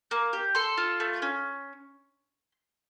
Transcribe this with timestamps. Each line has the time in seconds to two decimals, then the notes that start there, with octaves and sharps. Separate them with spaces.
0.11 A#3
0.33 G4
0.55 A4 C6
0.78 F4
1.00 A3
1.22 C#4